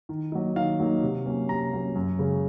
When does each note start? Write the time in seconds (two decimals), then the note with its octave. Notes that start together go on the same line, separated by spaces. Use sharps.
0.09 D#3
0.32 F#3 A#3 D#4
0.56 D#3 F5
0.80 F#3 A#3 D#4
1.03 C3
1.26 F#3 A#3 C#4
1.49 C3 A#5
1.73 F#3 A#3 C#4
1.95 F#2
2.19 C#3 G#3 C#4